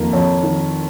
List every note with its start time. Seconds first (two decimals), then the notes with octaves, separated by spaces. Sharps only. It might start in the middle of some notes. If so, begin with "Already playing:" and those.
Already playing: F2 D#3 A#3
0.13 F2 C#5
0.43 D#3